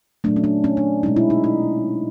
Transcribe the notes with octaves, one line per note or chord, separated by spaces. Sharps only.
A#2 F#3 A3 D4
C#4
D4
C#4
D4
B2 G#3 C#4 D#4
E4
D#4
D#4